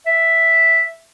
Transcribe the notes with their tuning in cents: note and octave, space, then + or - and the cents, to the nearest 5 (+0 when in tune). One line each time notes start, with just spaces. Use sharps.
E5 +0